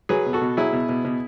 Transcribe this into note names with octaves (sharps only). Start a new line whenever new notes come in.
F#3 G#4 B4
B2
F#4 A4
B2
F#3 E4 G#4
B2
B2
B2